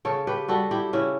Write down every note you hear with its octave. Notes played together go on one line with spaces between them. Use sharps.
C#3 A4 C#5
G4 B4
G3 F#4 A4
E4 G4
C#3 C#4 E4